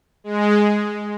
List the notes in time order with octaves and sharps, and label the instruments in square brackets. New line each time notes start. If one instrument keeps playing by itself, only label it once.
[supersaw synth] G#3